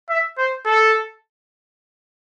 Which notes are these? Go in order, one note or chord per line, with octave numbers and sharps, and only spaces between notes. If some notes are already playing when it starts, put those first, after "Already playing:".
E5
C5
A4